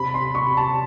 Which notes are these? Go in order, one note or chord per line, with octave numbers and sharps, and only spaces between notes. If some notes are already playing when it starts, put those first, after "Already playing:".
Already playing: C3 B5
C6
C3 C#6
A5